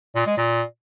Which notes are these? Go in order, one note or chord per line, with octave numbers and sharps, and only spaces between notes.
A#2
G#3
A#2